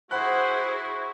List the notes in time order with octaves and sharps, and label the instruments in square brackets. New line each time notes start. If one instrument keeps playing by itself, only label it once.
[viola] E4 G#4 [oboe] F#4 [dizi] C5 [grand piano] F#5 B5 F#6